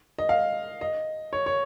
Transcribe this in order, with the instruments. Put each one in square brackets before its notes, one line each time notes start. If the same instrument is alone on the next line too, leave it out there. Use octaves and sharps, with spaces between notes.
[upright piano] D#5
F5
D#5
C#5
C#5